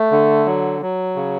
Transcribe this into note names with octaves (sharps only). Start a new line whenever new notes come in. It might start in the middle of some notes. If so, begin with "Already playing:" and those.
Already playing: A3
D3
F#3
F#3
C#3